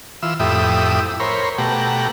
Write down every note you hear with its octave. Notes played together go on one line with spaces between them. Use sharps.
E3 F4 E6
F2 A2 E4 G4 E5 D#6
A#4 C5 C#5 B5
B2 A3 G4 F#5 A#5